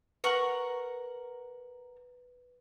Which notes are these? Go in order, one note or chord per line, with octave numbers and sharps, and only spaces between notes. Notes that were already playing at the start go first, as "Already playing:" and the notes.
A#4 B4 F#5 C#6 F#7